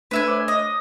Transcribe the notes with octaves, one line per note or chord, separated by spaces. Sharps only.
A3 D4 B4 E5 G#5 F#6
C5 C#5 D6
D#5